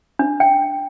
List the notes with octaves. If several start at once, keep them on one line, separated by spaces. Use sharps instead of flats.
D4
G5